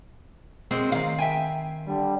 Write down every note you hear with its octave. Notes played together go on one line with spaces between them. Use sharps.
F#3 G#3 A#3 C4
D#3 F5
E5 G5 G#5
D3 G3